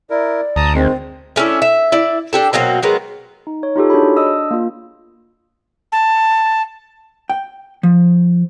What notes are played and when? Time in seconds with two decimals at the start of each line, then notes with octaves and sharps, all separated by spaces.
0.10 E4 A#4 D5
0.56 D2 A5 A#5 D#6
0.74 D#3 G#3 C4
1.36 A3 C#4 D4 E4
1.62 E5
1.92 E4 D5
2.33 D4 G4 A4
2.53 B2 F#3 A#3 C4
2.83 F#3 G#3 B3 A#4
3.47 D#4
3.63 C#5
3.76 D#4 F4 G4 A4
3.90 D4 F#4 G#4 C#5 B5
4.17 D4 D#5 D#6 E6
4.51 A#3 F4
5.92 A5
7.30 G5
7.83 F3